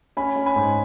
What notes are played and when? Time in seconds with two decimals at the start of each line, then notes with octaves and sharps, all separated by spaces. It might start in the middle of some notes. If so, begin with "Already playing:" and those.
0.17 C#4 G#5 B5
0.36 C#4
0.46 G#5 B5
0.56 G#2